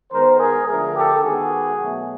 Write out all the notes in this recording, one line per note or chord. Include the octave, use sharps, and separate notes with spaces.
D#3 G#3 B3 A#4 C5
G#4 A#4
D3 F3 A3 G#4 A#4
G4 A4
D#3 G#3 B3 F#4 G#4
B2 F#3 A3